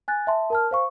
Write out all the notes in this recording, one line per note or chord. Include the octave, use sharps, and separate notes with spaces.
G#5 F#6 A6
E5 A5 C6
A#4 A5 F6
C5 F5 C#6